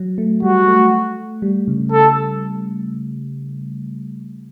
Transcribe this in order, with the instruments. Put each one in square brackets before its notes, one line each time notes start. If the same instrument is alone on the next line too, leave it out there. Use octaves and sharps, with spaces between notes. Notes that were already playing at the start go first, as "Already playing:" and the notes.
Already playing: [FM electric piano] F#3
A3
[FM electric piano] G3 [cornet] F#4
[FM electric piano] A3
G3
C#3
[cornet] A4